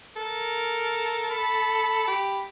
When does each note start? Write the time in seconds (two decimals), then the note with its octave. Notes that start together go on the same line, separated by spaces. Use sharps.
0.16 A4 A#4
1.31 B5
2.08 G4